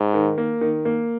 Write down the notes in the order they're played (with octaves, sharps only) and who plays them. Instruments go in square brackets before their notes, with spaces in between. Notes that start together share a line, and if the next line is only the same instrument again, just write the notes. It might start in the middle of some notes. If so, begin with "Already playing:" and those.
Already playing: [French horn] G#2
[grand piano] D#3
A#3
D#3
A#3